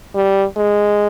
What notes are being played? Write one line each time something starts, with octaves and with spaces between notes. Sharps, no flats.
G3
G#3